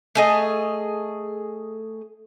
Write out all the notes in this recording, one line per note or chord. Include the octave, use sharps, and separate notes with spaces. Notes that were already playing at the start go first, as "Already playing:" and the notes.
A3 G#4 D#5